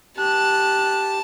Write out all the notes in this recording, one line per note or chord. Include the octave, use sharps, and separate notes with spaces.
G4 A5 F#6